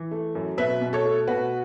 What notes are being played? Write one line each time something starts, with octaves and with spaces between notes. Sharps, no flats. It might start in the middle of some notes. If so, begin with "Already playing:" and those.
Already playing: E3
A3
F#2
B2 B4 E5
B2
A4 C#5
A3
B2 F#4 B4